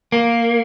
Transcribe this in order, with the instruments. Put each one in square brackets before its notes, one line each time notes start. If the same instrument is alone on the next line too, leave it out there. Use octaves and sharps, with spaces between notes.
[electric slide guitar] A#3